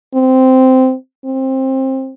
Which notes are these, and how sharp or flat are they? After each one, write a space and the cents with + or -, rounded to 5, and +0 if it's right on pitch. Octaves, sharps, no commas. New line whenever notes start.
C4 -10
C4 +20